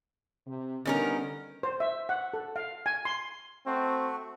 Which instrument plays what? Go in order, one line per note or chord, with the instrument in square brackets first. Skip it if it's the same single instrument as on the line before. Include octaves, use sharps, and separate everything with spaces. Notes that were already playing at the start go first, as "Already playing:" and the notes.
[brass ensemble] C3
[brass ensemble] D3 G3 B3 [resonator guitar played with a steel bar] D#3 C#4 A#4
[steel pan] C5
E5
F#5
A4
F5
G#5
C6
[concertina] A3 F#4 [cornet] C4